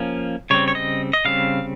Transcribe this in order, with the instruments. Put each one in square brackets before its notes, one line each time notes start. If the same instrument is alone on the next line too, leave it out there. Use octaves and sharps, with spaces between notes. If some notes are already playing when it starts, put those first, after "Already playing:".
Already playing: [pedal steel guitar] F3 A#3 C#4
C#3 G3 C4 C#5
C#5
D#5
D#5
C#3 G3 C4 F5